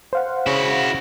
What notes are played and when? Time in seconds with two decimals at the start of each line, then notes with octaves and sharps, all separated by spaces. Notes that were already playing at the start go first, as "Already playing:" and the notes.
0.13 C5 F5 F#5
0.47 C#3 E4 F#4